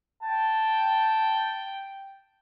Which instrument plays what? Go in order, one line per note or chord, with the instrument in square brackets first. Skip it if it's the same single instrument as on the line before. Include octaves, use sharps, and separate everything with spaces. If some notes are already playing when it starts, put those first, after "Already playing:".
[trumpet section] G5 [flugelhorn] A5